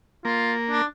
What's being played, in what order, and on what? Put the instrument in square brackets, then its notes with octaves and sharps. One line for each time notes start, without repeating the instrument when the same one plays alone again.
[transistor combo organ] A#3 [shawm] F4
[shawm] D4